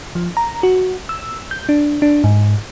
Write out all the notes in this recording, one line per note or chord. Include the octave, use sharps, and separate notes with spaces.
F3
A#5
F#4
E6
G6
D4
D4
G#2